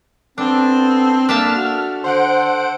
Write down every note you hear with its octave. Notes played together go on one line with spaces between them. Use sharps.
B3 C4 D4 A4 A5
A#3 D4 A4 E5 A5 F6
F#4
D3 C5 F#5 D7